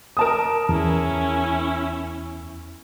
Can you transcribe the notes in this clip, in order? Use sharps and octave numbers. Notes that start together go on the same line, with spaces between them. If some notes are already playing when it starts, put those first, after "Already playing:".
A#4 A5 D#6
E2 C#4 E4